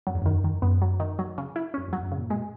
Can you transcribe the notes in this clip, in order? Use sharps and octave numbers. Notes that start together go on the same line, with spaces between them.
F#2 F#3
E2
F#2 D#3
D#3
F#2 B3
F#3
D#3
F#3
C#3
E4
F#2 C#4
E2 F#3
F#2
C#3
A#2
B2 G#3